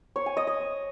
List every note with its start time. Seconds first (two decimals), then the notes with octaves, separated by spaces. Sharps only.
0.16 C#5
0.26 G#5
0.37 D#5
0.47 D#5